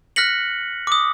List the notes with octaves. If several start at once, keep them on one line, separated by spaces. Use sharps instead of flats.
F6 F#6 A#6 B6 C#7 F#7
D6 D#6